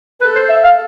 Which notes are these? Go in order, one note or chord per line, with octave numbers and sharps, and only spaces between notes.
A4 B4
C5
E5
F5